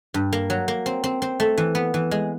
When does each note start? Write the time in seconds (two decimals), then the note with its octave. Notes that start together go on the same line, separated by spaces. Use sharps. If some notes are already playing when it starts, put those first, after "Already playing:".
0.14 G2
0.33 A#3
0.50 F#3
0.68 A#3
0.86 C4
1.04 C4
1.22 C4
1.40 A3
1.58 E3
1.75 B3
1.94 E3
2.11 G#3